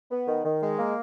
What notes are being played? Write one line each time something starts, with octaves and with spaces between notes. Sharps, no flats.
B3
D#3
D#3
G#3
A#3